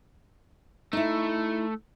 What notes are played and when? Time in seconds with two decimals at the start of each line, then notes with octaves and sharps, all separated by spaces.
0.93 A3 D#4 E4